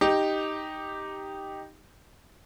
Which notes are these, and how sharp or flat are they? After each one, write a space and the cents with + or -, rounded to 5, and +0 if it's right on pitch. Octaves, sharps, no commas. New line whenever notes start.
D#4 +0 G4 +0